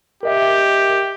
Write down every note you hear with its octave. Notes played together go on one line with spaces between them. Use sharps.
G4 A#4 D#5 E5